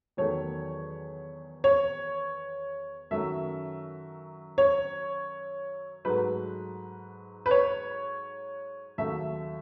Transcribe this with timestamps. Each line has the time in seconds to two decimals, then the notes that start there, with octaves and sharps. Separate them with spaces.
0.17 E2 D#3 F#3 A3 C#5
1.64 C#5
3.11 F#2 D#3 F#3 A3 E5
4.58 C#5
6.05 G#2 F#3 A3 B4
7.46 B4
7.51 C#5
8.98 D#2 C#3 F#3 A3 E5